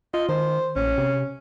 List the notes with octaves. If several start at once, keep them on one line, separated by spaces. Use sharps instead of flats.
F4 D#5
D#3 C5
A#1 C#4
C3